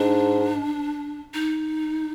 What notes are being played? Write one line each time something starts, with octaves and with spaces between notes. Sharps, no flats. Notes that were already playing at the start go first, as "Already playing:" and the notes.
Already playing: G#2 D4
D#4